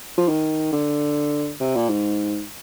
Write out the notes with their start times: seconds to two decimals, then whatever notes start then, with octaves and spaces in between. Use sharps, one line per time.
0.18 F3
0.29 D#3
0.73 D3
1.60 C3
1.75 A#2
1.89 G#2